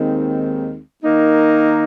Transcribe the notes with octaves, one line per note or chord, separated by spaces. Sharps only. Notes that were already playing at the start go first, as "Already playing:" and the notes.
Already playing: D#2 D#3 G#3 C4
D#3 A#3 D#4